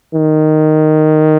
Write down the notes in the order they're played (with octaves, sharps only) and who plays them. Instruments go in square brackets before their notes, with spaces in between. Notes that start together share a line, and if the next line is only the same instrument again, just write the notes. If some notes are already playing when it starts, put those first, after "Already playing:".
[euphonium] D#3